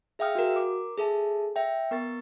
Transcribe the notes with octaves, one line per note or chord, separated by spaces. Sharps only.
G#4 E5 F5 G5 D#6 F6
F#4 A#4
A#4 D6
G#4 A4 E5 A5
E5 G5
B3 A#4 C#6 A6